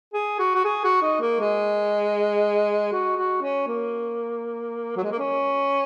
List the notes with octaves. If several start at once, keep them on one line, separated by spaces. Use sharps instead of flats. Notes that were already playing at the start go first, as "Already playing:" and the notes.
G#4
F#4
F#4
G#4
F#4
D#4
A#3
G#3
F#4
F#4
C#4
A#3
F#3
G#3
A#3
C#4